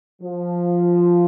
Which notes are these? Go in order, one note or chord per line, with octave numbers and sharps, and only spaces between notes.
F3